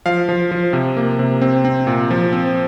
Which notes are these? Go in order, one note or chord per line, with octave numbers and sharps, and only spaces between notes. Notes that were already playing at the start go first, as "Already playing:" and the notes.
F3 F5
F3
F3
C3
A#3
C3
C4
C4
A#2
F3
C4